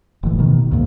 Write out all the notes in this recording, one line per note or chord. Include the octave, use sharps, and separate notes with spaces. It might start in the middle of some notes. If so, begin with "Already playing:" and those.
F1 A2 E3
B2 D#3
D2 G#2 A#3